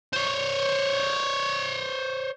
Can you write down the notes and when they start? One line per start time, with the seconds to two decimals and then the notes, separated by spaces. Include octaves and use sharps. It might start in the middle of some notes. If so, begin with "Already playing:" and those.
0.13 C5 C#5